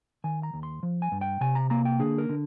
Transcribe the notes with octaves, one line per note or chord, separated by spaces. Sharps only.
D#3 G#5
A#5
D#2
C6
F3
G#5
G2
G5
C3 G#5
A#5
A#3 A#5
G5
D3 G#4
A#4
D3